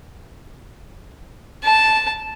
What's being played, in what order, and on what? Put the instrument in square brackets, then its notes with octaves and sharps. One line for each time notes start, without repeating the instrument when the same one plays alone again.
[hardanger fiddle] A5